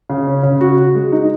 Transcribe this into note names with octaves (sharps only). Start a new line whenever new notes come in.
C#3
C#4
C#3
F#4
F#4
G#3
D#4